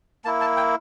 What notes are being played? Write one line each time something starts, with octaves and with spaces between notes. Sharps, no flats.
A#3 E4 A5
A5
G5